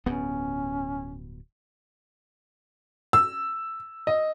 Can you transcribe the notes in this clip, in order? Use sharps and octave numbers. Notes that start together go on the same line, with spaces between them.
D1 G2 B3 C#4
E6
D#5